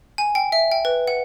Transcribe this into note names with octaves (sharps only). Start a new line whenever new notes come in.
G#5
G5
E5
G5
B4
F#5